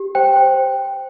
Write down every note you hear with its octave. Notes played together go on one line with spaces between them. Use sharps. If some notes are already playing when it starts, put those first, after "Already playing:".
Already playing: G4
C5 G5
C5